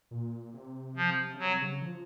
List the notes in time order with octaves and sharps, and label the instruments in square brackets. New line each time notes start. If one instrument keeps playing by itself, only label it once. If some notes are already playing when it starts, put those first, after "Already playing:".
[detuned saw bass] A#2
C3
[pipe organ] F3
[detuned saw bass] C#3
[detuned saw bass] C3 [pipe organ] F#3
[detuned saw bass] C#3
F3